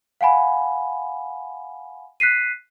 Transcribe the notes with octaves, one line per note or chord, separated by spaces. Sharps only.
F5 F#5 G#5 B5
F#6 B6 C7 D#7